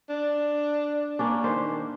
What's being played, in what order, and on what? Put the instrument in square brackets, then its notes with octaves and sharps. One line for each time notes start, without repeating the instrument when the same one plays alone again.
[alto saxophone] D4
[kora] A#3 C#4 D4
[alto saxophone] D#3 [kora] B4 C5